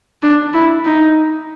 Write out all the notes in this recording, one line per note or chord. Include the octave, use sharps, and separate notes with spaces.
D4
E4
D#4